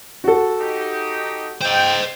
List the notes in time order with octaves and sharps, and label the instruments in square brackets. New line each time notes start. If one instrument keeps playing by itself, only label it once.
[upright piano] F#4 A4
[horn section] D#4 G4
[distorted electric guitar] C5 D#5 [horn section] G5